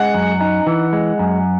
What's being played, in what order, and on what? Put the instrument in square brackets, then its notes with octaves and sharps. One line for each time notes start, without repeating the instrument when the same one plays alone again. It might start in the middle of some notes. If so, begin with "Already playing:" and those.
Already playing: [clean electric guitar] G#3 [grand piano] F#5
[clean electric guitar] F#2
D#4
E3
G#3
F#2